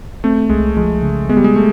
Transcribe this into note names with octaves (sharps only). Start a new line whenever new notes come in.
A3 C4
C2 G#3
F3 G#3
C#3
G#3 B3
G3
G#3
A3